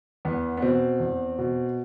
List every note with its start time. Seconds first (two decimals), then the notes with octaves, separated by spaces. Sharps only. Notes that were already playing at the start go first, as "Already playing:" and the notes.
0.25 E2 B3
0.57 B3
0.62 B2 C4
1.00 E2
1.38 B2